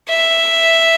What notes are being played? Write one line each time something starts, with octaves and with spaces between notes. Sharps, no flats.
E5